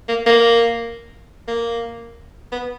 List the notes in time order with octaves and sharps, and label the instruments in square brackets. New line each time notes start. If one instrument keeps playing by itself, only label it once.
[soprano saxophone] A#3
A#3
A#3
B3